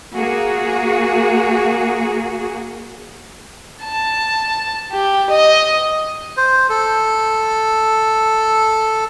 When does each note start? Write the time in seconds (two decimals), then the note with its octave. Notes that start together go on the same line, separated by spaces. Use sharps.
0.15 A#3 F#4 G#4
3.83 A5
4.92 G4
5.30 D#5
6.37 C5
6.70 A4